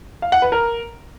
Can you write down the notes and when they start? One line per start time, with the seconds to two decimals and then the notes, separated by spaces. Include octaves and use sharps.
0.22 F5
0.32 F#5
0.42 B4
0.52 A#4